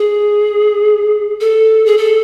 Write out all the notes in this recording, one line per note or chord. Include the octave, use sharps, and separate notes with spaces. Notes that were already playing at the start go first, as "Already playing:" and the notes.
Already playing: G#4
A4
G#4
A4